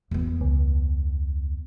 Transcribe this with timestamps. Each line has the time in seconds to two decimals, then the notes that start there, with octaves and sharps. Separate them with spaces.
0.11 E2 B3
0.41 C#2